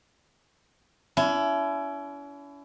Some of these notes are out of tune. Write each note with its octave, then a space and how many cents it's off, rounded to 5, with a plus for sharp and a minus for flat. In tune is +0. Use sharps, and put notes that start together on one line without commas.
C#4 +45 E4 +20